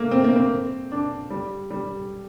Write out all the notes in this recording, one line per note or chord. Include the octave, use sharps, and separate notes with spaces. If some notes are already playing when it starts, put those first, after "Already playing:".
Already playing: A3 A#3
C4
A#3
C4
D4
G3
G3